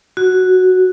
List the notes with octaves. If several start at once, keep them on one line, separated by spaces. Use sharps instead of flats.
F#4